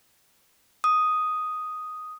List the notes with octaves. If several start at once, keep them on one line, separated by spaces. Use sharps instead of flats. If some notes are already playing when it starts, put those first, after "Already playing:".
D#6